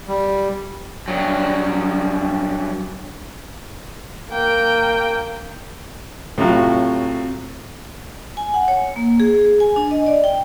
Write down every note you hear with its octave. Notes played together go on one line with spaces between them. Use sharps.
G3
G2 F#3
A#3 G5
A2 C3 F#3 F4
G#5
F#5
C#5
A#3
G#4
G#5
D4
D#5
D5
G5